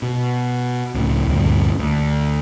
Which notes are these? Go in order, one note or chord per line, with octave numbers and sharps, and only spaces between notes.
B2
C#2 A2
D2 G2 A#2
D2